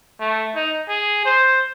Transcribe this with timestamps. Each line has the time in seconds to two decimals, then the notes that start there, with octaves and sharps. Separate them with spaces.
0.20 A3
0.55 D#4
0.88 G#4
1.25 C5